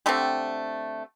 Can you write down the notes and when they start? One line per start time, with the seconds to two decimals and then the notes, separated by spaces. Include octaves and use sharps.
0.06 D3 A3 C4 G4